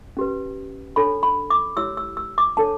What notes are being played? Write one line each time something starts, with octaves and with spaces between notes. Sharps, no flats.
C#4 G4 B4
D4 A4 C#5 B5
B5
D6
E4 G4 C#5 E6
E6
E6
D6
D4 A4 C#5 A5